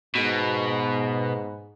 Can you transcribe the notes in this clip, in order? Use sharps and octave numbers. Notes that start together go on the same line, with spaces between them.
G#2 B2